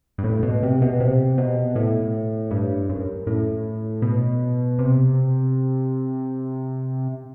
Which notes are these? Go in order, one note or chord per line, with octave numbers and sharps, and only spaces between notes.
G2
A2
B2
C3
B2
C3
B2
A2
G2
F#2
A2
B2
C3